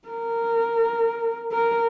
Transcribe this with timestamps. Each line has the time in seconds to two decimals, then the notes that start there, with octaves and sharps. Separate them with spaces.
0.08 A#4
1.52 A#4